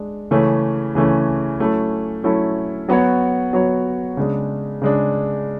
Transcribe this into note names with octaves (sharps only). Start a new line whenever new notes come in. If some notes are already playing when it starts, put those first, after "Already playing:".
Already playing: G#3 D4
C#3 E3 A3 C#4
C#3 E3 A3 C#4
F#3 A3 C#4 E4 A4
F#3 A3 C#4 E4 A4
F#3 B3 F#4 C#5
F#3 B3 F#4 C#5
C#3 G#3 D4
C#3 G#3 D4